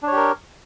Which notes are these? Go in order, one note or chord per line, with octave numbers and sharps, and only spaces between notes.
D4 G4 A#4 C#5